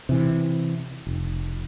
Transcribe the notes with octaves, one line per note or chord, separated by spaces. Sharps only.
C3 E3
F1